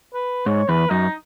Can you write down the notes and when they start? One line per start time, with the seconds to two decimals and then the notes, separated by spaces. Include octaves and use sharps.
0.14 B4
0.46 G#2 C#5
0.69 E2 B4
0.90 F#2 D#4